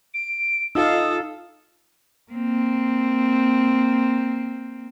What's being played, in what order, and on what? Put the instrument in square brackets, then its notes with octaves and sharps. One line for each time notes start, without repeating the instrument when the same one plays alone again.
[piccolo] D7
[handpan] D#4 F5 [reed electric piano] F4 E6 [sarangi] A4 [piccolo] D#6
[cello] A#3 C4